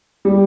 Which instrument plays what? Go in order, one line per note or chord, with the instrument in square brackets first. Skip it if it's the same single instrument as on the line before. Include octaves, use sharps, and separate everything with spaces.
[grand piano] G3